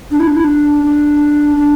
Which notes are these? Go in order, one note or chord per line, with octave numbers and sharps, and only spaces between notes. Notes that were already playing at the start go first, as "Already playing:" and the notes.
D4
E4
D4
E4
D4
D4
D4